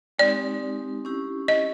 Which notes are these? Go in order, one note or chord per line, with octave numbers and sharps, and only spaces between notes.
G#3 C4 D#4 G4 D5
C#4 E4 G4
D#5